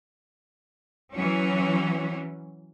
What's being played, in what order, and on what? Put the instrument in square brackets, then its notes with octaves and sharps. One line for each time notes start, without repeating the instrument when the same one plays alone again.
[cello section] E3 F#3 C#4